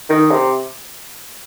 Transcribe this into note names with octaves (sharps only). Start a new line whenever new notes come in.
D#3
C3